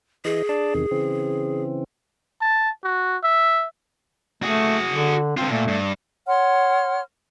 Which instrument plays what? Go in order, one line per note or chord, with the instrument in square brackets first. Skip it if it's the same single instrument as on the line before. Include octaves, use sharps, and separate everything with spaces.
[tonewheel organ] E3 D#5 [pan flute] G#4
[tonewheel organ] D4 D5 A5
E2 C3 D#3
C#3 E3 C4
[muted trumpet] A5
F#4
E5
[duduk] A3 [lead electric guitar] F#4 G#4
[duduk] D3
[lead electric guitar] D3 F4 [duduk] C4
[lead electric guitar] A#2 [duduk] A3
[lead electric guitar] G2
[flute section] C#5 F#5 C6 F6